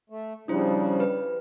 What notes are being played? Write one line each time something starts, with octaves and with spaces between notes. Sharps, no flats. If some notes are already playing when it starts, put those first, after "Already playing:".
A3
C#3 F3 G3 D4 E4 C5
B4